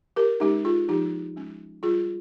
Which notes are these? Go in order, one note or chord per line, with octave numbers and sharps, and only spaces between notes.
G4 A#4
G#3 C#4 D#4 G4
F4 G#4
F3 D#4 G4
G#3 C#4
G3 F4 G#4